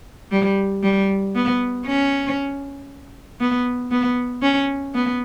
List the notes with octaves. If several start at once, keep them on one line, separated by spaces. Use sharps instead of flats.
G3
G3
B3
C#4
B3
B3
C#4
B3